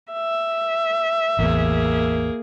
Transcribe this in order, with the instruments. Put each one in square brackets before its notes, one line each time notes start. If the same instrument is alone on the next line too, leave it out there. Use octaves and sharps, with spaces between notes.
[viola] E5
[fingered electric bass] A1 E2 [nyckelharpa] A#3 G#4